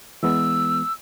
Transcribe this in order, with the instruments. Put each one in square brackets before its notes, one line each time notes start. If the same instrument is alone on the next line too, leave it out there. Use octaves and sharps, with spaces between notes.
[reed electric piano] E3 G#3 B3 [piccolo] E6